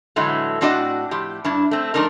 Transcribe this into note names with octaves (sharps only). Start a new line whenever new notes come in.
A2 D3 E3 F#3 G#3 A3
A2 C4 D4 F#4 D5 D#5
A2 F3 G4
G2 D4 E4
A3 C4
F3 A3 D4 D#4 A#4